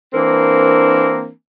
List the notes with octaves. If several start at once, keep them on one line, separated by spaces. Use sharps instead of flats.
E3 A#3 C4 D4 A#4